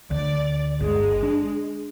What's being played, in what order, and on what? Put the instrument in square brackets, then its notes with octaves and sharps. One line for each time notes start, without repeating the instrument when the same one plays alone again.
[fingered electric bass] D2 [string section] D5
[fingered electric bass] G1 [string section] G#3
[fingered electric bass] D4